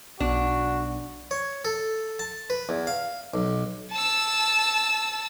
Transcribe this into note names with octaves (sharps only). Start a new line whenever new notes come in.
B1 D4 F#4
C#5
A4
A5
B4
E2
F5
B1
A5 E6